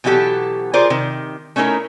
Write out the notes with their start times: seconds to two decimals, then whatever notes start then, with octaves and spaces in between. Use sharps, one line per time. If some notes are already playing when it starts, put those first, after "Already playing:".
0.04 B2 E3 F#3 E4 G4 A4
0.73 F4 G#4 A#4 C5 D5
0.90 C3 D#3
1.56 A3 C#4 D#4 E4 A#4